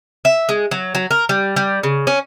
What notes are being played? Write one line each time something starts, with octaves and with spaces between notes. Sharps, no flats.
E5
G#3
F#3
F#3
A#4
G3
G3
C#3
C#4